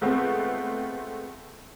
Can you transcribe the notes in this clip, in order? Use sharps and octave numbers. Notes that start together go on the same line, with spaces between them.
G#3 A3 B3 C4 F4